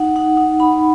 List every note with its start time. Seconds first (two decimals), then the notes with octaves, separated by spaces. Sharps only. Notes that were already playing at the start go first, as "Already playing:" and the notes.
Already playing: D#4 F#5
0.16 D#4 F#5
0.37 D#4
0.60 D#4 B5